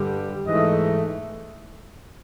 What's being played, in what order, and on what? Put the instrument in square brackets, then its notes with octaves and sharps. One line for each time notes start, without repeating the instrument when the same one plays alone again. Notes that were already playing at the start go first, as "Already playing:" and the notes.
Already playing: [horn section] G2 D3 G3
G#2 E3 A3 D#5